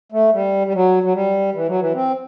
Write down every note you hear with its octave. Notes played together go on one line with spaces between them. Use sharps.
A3
G3
G3
F#3
F#3
G3
E3
F#3
E3
C4